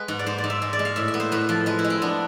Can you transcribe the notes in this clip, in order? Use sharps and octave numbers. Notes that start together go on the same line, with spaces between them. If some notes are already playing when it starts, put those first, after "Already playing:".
Already playing: G#3 B3 B4
G#2
D5
G#2 C5
D5
G#2
E5
G#3
D5
G#3
F5
A2 E5
E5
B3
C5
A2 B4
F3
G#3 B4
E4
G#3
C4
B3 D4